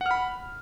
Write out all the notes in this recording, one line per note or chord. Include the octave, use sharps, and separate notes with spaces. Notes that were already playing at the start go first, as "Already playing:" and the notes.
F#5 B5 F6